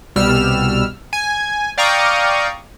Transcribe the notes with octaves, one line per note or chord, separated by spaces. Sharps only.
C2 B2 G3 E6 F6
G#5
D5 F5 G5 A#5 C#6 D#6